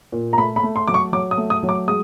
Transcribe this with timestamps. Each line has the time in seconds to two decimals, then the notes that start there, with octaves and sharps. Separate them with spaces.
0.12 A#2
0.33 A#5
0.37 A3 B5
0.56 B5
0.63 A3
0.76 C6
0.88 F#3 D6
0.94 C#6
1.13 F#3 D6
1.31 D#6
1.37 A3
1.50 D#6
1.63 F#3
1.69 D6
1.88 G#3 D#6